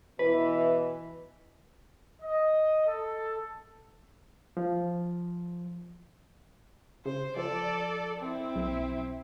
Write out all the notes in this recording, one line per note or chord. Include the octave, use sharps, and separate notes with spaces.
B2 E3 B4
D#5
A4
F3
C#3 C5
F3 A4 D5
C4 E4
B1